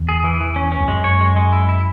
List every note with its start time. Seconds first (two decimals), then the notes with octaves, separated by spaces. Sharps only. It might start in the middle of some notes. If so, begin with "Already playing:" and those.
Already playing: E2
0.09 G#4
0.24 E3
0.41 E3
0.56 C#4
0.72 C#4
0.81 E2
0.88 F#2 G#3
1.04 C#5
1.21 G#3
1.36 G#3
1.52 E4
1.69 E4